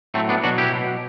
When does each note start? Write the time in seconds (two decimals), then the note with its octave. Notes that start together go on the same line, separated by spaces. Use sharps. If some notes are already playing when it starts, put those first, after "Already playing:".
0.14 A2 F#3 A3 C4
0.29 B3 D4
0.43 B2 F#3 D4 F#4
0.58 E4 G4
0.73 B2 F#3